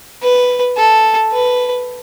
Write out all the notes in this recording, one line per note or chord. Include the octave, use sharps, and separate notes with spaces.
B4
A4
B4